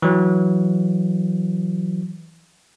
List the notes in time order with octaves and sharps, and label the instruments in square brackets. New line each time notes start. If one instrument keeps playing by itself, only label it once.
[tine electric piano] E3 F#3